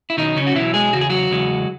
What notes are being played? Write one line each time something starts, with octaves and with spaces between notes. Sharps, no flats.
E4
B2 D#3 F#3 D#4
C#3 C#4
F#4
B2 E3 F#3 E4
G#3 G#4
E2 C#3 F#4
G#4
F#3 F#4
E2 C#3 G#3